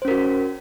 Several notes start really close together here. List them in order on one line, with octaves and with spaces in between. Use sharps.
C5 C#4 A#4 F#4